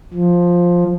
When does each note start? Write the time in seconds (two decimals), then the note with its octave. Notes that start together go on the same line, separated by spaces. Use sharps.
0.14 F3